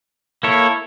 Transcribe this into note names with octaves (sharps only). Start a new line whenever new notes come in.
A#3 E4 A4 C#5